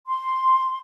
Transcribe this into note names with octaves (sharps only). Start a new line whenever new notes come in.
C6